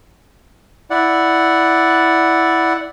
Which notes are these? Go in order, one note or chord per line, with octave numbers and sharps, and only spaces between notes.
E4 D5 F#5